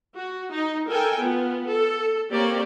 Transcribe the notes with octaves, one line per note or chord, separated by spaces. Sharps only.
F#4
D#4
A4 A#4 G5 G#5
B3 F4
A4
A#3 C4 G4 A#4 C#5 D5